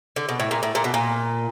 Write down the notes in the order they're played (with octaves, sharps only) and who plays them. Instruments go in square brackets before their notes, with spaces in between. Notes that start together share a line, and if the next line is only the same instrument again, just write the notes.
[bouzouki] D3
B2
A2
A#2
A2
A#2
B2
A#2